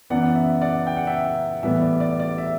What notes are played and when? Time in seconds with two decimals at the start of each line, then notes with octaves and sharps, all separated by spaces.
0.10 F#2 E3 B3 D5 F#5
0.35 E5
0.61 D5 F#5
0.87 G5
0.97 F#5
1.07 E5 G5
1.63 A2 E3 G3 B3 E5
1.82 D5
2.00 D5
2.20 D5
2.38 E5